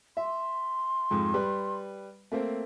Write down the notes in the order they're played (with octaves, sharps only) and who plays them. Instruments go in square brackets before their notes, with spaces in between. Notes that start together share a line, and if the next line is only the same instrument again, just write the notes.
[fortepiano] E5 [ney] C6
[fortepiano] F2 G#2
G3 B4
A3 A#3 C4